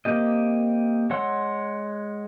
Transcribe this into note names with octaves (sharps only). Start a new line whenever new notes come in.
A#3 C4 G4 D#5
G#3 C#5 F#5 C6 E6